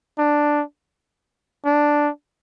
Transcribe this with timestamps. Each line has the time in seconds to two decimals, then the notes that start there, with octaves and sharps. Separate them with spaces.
0.18 D4
1.66 D4